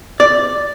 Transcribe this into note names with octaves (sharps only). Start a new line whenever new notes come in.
D5